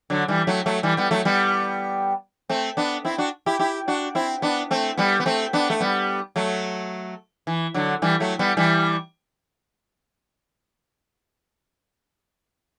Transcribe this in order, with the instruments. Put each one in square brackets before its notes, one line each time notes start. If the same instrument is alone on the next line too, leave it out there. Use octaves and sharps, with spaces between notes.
[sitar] D3 F#3
E3 G3
F#3 A3
F#3 A3
E3 G3
G3 B3
F#3 A3
G3 B3
A3 C4
B3 D4
C4 E4
D4 F#4
E4 G4
E4 G4
D4 F#4
C4 E4
B3 D4
A3 C4
G3 B3
B3
A3 C4
B3 D4
A3
G3 B3
F#3 A3
E3
D3 F#3
E3 G3
F#3 A3
G3 B3
E3 G3